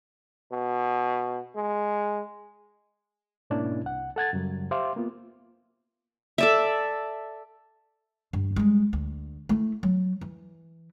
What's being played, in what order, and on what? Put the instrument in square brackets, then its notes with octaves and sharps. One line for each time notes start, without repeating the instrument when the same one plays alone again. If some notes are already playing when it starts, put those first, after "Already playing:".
[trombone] B2
G#3
[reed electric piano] G#2 B2 A#3 C#4 D4 E4
C2 F#5
A4 F#5 G#6 A6
F#2 C#3 F#3 G3
G4 C5 E5 F5 C6 D6
A#3 B3 F4
[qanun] A4 D5 E5
[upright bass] G2
G3 G#3
D2
A3 E4
F#3
E3